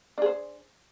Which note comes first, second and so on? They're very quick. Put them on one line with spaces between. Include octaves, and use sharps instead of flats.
D4 G#4 C5